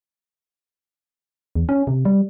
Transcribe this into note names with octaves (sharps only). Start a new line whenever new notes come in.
E2
C#4
C3
G3